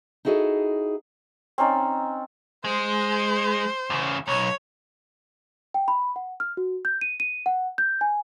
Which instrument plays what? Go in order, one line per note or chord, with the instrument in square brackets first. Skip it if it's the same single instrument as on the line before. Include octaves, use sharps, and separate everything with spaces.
[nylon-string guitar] D#4 E4 F#4 G#4 A4 D#5
[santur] C4 C#4 D#4 D5
[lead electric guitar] G#3 [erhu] C5
[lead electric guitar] E2 C#3
[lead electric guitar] B1 [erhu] C#5
[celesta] G5
B5
F#5
F6
F#4
G6
D#7
D#7
F#5
G6
G#5